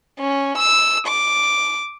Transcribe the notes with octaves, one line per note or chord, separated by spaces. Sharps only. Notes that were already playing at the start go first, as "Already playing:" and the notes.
C#4
E6
D6